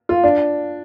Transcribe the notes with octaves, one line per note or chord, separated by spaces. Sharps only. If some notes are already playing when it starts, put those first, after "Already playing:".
F4
D4